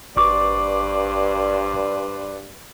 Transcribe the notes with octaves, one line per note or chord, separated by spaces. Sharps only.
G#1 G2 B4 C5 D5 C#6 D6